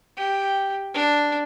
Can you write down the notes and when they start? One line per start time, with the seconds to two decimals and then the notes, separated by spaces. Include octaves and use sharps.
0.18 G4
0.95 D4